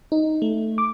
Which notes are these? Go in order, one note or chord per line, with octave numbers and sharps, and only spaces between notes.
D#4
A3
D6